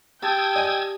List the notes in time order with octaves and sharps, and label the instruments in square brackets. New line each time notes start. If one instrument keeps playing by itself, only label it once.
[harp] G4 A5 [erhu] G5 [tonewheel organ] D#6 E6 G#6
[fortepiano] D5 D#5 G#5